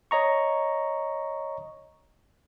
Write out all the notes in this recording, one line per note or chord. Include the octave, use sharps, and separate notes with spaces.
C#5 D#5 A#5 C#6